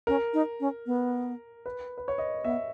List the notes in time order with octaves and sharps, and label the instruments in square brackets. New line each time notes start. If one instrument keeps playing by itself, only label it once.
[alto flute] C#4 [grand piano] A#4
[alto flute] D#4
C#4
B3
[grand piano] B4
B4
C#5
D#5
[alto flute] B3 [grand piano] E5